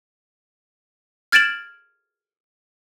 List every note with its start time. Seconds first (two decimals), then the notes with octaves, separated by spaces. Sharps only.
1.32 F6 G#6 A6 D7 E7 F#7